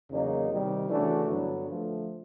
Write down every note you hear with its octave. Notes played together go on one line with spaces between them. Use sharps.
E2 C#3 F#3 A#3 D#4
C3 D#3 G3
C#3 E3 A3 D4 F#4
G2 D3 F#3 B3
D3 F3 A3